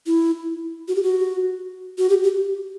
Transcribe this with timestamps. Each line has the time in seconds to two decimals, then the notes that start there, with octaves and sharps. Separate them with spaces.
0.07 E4
0.88 F#4
0.96 G4
1.03 F#4
1.98 F#4
2.09 G4
2.23 G4